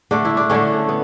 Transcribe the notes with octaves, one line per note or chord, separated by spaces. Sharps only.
D3 A3 D4
E4
D4
D3 A3 C#4
B3